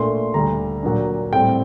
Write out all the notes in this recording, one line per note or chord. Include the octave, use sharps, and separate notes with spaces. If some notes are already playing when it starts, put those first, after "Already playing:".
Already playing: A#2 A3 D4 C6
D2 D3 G3 A#5
A#2 F#3 A#3 D4
A2 G3 C4 G5